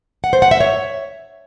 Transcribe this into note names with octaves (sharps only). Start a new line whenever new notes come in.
F#5
C5
F#5
E5
C#5